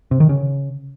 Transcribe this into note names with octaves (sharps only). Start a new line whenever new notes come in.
C3
D#3
C#3